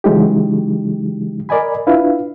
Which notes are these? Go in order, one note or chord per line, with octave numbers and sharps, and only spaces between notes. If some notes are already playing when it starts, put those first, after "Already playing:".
C#3 E3 F#3 G#3 D#4 G4
A#4 D5 D#5 G#5 B5
D4 E4 F4 B4 F5